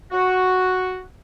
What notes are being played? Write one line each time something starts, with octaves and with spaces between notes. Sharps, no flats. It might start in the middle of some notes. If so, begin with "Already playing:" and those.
F#4